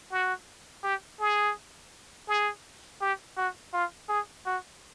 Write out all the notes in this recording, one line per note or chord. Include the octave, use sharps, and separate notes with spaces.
F#4
G4
G#4
G#4
G4
F#4
F4
G#4
F#4